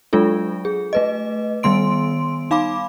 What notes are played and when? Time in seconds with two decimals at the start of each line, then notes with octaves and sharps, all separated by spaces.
0.13 F#3 G#3 D4 F4 A4
0.65 G#4
0.93 A3 B4 D#5
1.63 D#3 G3 B3 C6 D7
2.51 D#4 F5 B5 D6